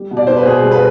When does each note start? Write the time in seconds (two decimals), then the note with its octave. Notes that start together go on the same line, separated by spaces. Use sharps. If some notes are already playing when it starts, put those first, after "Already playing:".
Already playing: G3
0.11 B2
0.17 D5
0.27 B3 C5
0.37 B4
0.45 B2 G#4
0.63 G3
0.72 B4